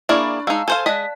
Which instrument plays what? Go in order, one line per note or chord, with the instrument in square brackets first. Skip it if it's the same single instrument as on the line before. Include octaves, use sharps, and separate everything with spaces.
[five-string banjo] A#3 E4 G#4 [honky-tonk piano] D4 D5 [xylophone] B5 C#6 F6
[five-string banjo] G#3 D#4 [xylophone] F5 A5 [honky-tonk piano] E6
[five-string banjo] A4 C5 F5 [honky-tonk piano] G#5 [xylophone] E7 G7
[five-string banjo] G#3 D#5 [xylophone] D5 A5 F#6 [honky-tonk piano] B6